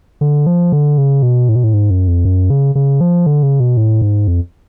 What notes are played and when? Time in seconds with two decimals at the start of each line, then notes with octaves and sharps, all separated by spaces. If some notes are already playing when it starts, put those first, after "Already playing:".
0.21 D3
0.47 F3
0.72 D3
0.98 C#3
1.23 B2
1.49 A2
1.56 B2
1.64 A2
1.74 G#2
1.90 F#2
2.08 F2
2.25 F#2
2.50 C#3
2.75 C#3
3.01 F3
3.26 D3
3.43 C#3
3.60 B2
3.77 A2
4.02 G#2
4.28 F2